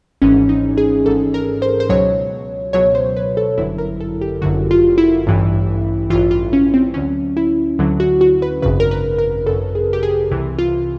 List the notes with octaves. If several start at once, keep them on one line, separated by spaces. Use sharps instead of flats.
G#1 G#2 E3 C#4
D#4
G#4
G#1 G#2 E3 A4
A#4
C5
C5
C#2 B2 F#3 C#5
C#2 B2 F#3 C#5
C5
B4
A4
G1 F#2 D3 F#3 E4
A#4
A4
G4
G1 F#2 D3 F#3 F#4
F4
E4
A1 G2 E3
A1 G2 E3 F4
F4
C#4
C4
D2 D3 F#3 C#4
E4
D2 D3 F#3
F#4
F#4
B4
G#1 F#2 C#3 B4
A#4
B4
A#4
G#1 F#2 C#3 A4
G#4
G4
G#4
C2 C3 E3
F4